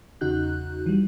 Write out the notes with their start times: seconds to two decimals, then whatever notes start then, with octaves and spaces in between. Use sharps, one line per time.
0.21 E2 C#3 D#4 F#4 F#6 G6
0.86 E3 G3